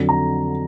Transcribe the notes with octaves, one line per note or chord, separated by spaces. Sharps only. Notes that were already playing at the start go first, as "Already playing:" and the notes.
Already playing: F2 D3 F#3
A#5